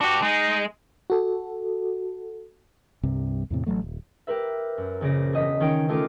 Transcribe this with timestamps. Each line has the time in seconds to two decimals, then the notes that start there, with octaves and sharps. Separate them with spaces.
0.01 D4 F#4 G4
0.22 G#3 D#4
1.10 F#4 A4
3.03 C2 G2 C3
3.50 E2 A2 C3
3.66 A1 A#2 F#3 A3
3.82 D#1
4.27 G4 A#4 B4 E5
4.77 F#2
5.01 A#1 C#3 D5 A#6
5.33 E1 D#5 B6
5.60 D#3 C#4 D#4 G5 C#7 D7
5.89 A3 C#4 D#4 F4 A#4 D6